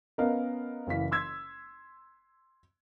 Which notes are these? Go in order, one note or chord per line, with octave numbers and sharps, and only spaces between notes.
B3 C#4 A#4 D#5 F5
F#1 E3 F5 B6
C6 E6 G#6